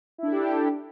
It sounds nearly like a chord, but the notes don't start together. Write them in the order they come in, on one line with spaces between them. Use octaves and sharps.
E4 D4 A4 G4